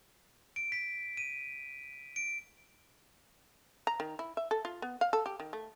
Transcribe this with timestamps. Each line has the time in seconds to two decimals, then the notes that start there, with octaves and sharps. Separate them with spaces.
0.56 D7
0.72 B6
1.17 D#7
2.16 D7
3.87 A#5
4.00 D#3
4.19 E4
4.37 E5
4.51 A4
4.65 F4
4.82 B3
5.01 F5
5.13 A4
5.26 G4
5.40 D#3
5.53 A3